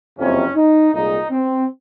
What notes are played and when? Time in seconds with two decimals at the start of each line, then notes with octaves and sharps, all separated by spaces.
0.19 F#1 F2 C3 C#4
0.56 D#4
0.94 C2 A#2 G#3 D#4
1.31 C4